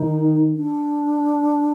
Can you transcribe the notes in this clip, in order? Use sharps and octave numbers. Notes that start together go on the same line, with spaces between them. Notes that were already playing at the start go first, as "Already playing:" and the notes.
Already playing: D#3 D#4
D4